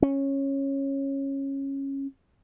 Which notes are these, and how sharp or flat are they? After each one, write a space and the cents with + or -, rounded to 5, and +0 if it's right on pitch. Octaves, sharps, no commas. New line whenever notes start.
C#4 -15